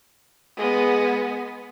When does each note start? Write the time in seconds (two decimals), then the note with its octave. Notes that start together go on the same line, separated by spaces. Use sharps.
0.57 G#3 B3